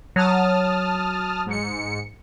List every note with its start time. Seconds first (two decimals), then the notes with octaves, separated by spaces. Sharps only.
0.16 F#3 A5 D#6 F6
1.46 G#2 C#7